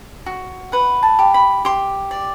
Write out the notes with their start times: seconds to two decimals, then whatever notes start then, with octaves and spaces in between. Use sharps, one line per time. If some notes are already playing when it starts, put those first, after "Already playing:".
0.26 F#4
0.72 B4 F#5
1.03 A5
1.19 G4
1.34 B5
1.65 G4 C6
2.11 D5